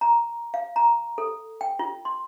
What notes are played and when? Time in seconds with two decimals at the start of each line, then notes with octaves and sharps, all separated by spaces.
0.01 A#5
0.54 F5
0.76 A#5
1.18 A4
1.61 G5
1.79 F4
2.05 C6